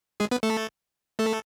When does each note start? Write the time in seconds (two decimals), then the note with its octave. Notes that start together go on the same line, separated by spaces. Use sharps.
0.20 G#3 G#4
0.31 B3 B4
0.43 A3 A4
1.19 A3 A4